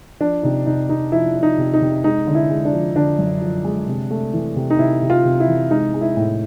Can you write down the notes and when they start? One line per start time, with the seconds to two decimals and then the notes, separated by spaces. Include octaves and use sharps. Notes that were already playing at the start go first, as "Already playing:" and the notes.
0.20 F3 D4
0.43 C3 D#4
0.66 C3 D#4
0.89 C3 D#4
1.12 F3 E4
1.35 F3
1.43 D#4
1.58 C3
1.74 D#4
1.81 C3
2.04 G#3 D#4
2.27 D3
2.35 E4
2.50 G#3
2.65 D4
2.73 F3
2.96 D3 D4
3.18 F#2
3.41 F3
3.64 G#3
3.88 C3
4.10 A3
4.33 E3
4.56 C3
4.70 D#4
4.79 C3 E4
5.02 C3
5.10 F4
5.25 C3
5.40 E4
5.48 E3
5.71 G#3 D#4
5.94 G#3
6.01 E4
6.17 A2